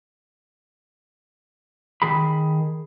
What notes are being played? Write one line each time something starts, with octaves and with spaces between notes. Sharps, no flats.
D#3 G#4 B5